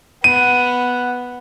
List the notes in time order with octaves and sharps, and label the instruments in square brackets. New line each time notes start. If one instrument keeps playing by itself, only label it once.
[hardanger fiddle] B3 [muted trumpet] F#5 [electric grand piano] D#7